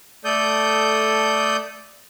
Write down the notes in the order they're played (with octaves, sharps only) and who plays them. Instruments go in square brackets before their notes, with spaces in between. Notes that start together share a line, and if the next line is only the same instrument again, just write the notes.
[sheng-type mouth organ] A3 A4 D5 D#6 G6